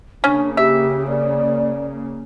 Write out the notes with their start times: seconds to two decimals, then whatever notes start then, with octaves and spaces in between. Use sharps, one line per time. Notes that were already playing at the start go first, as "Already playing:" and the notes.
0.24 C#3 A#3 C#4 D4
0.57 G4 E5
1.08 D5